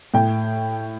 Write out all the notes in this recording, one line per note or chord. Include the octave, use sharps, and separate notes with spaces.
A2 G5